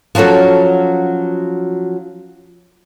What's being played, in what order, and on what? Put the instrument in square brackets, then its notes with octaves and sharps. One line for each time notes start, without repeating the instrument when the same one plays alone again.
[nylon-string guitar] F3 F#3 C#4 F#4 A4